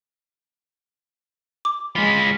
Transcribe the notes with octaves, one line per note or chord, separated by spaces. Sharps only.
D6
G#3 F4 B5